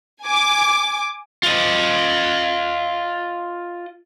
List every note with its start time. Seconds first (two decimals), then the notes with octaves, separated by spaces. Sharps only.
0.22 G#5 D6
1.43 F4 D#5